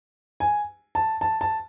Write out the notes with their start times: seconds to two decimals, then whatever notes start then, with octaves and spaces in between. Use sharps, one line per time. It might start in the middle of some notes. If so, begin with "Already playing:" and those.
0.40 G#5
0.95 A5
1.21 A5
1.41 A5